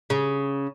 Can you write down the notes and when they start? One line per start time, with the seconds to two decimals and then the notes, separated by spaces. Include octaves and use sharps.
0.10 C#3